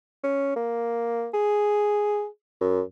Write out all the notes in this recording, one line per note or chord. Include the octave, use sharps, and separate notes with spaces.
C#4
A#3
G#4
F#2